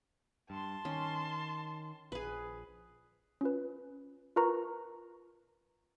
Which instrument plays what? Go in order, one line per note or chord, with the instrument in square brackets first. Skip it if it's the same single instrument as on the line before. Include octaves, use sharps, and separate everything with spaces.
[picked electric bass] G2 [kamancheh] A5 C6
[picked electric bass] D#3 [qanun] C#4
[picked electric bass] A#1 [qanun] G#4 B4
[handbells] C#4 F4 B4
F4 A#4 B4 A#5 C#6